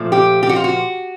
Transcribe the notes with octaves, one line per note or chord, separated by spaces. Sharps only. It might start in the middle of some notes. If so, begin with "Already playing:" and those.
Already playing: A#2 F3 A3
G4
G4
F#4
F4
F#4